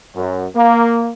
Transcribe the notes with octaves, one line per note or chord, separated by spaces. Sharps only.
F#2
A#3